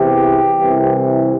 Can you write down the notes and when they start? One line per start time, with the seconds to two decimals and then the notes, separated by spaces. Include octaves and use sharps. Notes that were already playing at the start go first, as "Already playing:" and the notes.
Already playing: E2 C3 E3 G4
0.59 C2 C3 E3